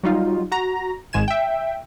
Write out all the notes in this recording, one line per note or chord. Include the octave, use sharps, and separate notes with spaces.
F#3 G3 D#4 F4
F#4 A#5 A#6
G#1 G#2 G#3 G#5 G#6 E7
E5 G5